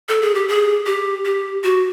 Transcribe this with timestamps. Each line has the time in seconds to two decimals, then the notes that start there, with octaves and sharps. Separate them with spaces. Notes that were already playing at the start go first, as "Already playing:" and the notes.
0.09 A4
0.21 G#4
0.35 G4
0.48 G#4
0.86 G4
1.25 G4
1.64 F#4